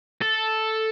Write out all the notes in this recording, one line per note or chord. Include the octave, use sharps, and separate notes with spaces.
A4